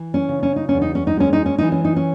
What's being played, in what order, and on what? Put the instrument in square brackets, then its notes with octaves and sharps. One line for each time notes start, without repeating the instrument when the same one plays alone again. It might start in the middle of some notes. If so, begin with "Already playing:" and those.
Already playing: [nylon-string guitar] E3
C#4
C#3
C#4
D#4
E2 C#4
D#4
C#4
D#4
G#3 C#4
D#4
C#4
E3 D#4
C#4
D#4
C#4